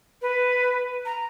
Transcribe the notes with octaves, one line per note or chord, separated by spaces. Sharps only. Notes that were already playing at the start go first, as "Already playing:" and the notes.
B4
A#5